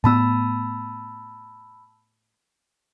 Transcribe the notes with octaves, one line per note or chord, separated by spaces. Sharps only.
A2 B3 A5 B5 E6